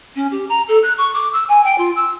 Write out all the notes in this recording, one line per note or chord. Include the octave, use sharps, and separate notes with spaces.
C#4
G4
A#5
A4
F#6
C#6
D6
E6
G#5
G5
F4
E6